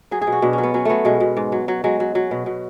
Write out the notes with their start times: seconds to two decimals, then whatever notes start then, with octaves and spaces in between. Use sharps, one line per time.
0.11 F#3 G#4
0.22 G#4
0.27 B2
0.32 F#4
0.42 B2 D4
0.53 C#4
0.58 F#3
0.63 B3
0.74 F#3 C#4
0.85 F#3 A3 B3
1.05 B2 G#3
1.20 B2
1.37 G#2
1.52 F#3
1.68 F#3
1.84 F#3 G#3
2.00 F#3
2.15 F#3
2.31 B2
2.46 B2